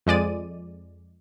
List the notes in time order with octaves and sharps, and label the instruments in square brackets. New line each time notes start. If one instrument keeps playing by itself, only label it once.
[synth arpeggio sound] F2 G#3 D5 D#7